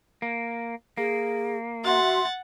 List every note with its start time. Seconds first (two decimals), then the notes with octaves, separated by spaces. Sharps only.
0.22 A#3
0.97 A#3 G#4
1.84 F#4 E5 F#5 C6 A6